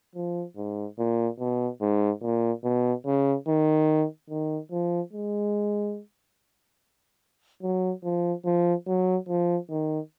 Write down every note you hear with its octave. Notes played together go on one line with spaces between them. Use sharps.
F3
G#2
A#2
B2
G#2
A#2
B2
C#3
D#3
D#3
F3
G#3
F#3
F3
F3
F#3
F3
D#3